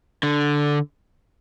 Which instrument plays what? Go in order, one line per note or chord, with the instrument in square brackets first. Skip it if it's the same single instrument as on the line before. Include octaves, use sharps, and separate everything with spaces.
[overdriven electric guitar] D3